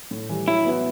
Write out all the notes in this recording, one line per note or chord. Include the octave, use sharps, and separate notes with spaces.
A2
E3 G3
F#3 E4
B3 F#4 B4